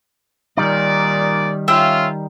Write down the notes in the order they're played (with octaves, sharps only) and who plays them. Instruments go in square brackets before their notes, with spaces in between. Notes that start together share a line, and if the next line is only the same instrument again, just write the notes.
[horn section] A#2 D5 [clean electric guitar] D#3 G3 D#4
[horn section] C#4 F4 [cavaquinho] E5 G5